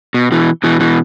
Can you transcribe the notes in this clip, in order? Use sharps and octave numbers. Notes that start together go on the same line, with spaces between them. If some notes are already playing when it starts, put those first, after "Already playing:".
B2
B2 E3
B2 E3
B2 E3